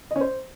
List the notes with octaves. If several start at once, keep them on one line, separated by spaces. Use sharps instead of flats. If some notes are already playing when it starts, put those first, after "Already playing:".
D#5
C#4
C5